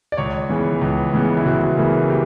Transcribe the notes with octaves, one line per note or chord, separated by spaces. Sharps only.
D5
C#2 C#5
C#3 E3 B3
C#2
C#3 E3 B3
E4
C#2 F#4
C#3 E3 B3 A#4
G4